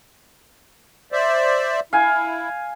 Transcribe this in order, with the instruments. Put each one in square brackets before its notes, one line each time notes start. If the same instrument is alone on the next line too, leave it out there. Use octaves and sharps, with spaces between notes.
[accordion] C5 D5 E5
[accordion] E4 [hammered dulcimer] F5 G#5